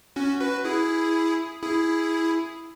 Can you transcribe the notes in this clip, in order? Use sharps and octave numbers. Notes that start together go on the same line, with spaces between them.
C#4 F#4
F#4 B4
E4 G#4
E4 G#4